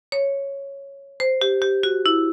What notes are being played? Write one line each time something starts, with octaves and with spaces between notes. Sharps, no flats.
C#5
C5
G4
G4
F#4
E4